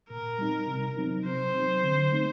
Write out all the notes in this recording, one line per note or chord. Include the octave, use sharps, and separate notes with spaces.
A#2 A#4
G3 C4 D#4
C3
F#3 C4 D#4
C3 C5
F#3 C4 D#4
D3
A3 C4 D#4